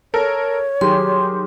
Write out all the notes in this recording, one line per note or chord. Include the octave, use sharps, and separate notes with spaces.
A4 A#4 C#5
D#3 F#3 G4 G#4 C6